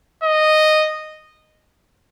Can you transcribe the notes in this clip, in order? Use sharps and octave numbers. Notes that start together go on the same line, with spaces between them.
D#5